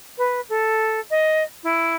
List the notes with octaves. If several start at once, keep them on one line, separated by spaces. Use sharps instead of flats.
B4
A4
D#5
E4